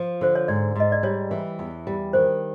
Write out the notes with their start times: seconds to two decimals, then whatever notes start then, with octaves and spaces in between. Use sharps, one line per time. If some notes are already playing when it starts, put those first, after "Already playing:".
Already playing: F3
0.21 D3 C5
0.35 C#5
0.48 G#2 D5
0.76 G#2 D#5
0.92 D5
1.03 G3 C#5
1.31 E3
1.59 E2
1.87 G3
2.13 D#3 C5